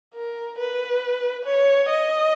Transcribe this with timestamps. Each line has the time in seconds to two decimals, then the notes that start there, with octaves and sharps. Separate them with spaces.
0.15 A#4
0.58 B4
1.45 C#5
1.89 D#5